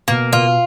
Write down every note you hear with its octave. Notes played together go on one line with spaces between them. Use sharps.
B2 A#3
B2 F4